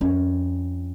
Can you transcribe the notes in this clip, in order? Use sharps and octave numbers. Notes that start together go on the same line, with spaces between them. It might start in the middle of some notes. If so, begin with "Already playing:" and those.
F2 C#4